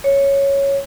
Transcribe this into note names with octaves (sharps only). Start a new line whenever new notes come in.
C#5